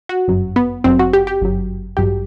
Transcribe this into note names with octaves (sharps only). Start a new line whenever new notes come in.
F#4
G1 F#2 F#3
B3
G1 F#2 F#3 C4
F#4
G4
G4
G1 F#2 F#3
A1 G2 F#3 G4